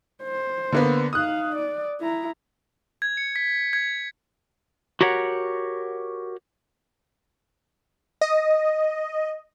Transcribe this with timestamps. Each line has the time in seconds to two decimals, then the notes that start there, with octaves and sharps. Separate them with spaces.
0.23 C5
0.72 D3 A#3 B3
1.13 D#4 F5 D#6 F#6
1.55 D5
2.01 E4 A#5
3.02 G#6
3.17 C#7
3.36 B6
3.73 G#6
5.01 F#4 G4 A#4 C#5 F#5
8.21 D#5